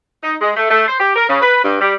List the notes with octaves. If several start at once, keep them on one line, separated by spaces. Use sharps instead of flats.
D#4
G#3
A3
A3
C5
G4
A#4
C#3
B4
G2
G3